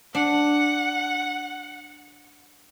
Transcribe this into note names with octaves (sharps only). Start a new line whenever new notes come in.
D4 F#5